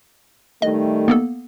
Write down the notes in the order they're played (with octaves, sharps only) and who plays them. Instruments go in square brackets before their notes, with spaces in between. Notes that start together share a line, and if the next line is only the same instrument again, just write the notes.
[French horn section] D#3 G3 A3 [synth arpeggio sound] D#5
[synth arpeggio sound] A#3 B3 A4